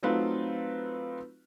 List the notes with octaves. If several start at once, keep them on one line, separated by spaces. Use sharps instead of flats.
F#3 A3 C4 D#4 F4 B4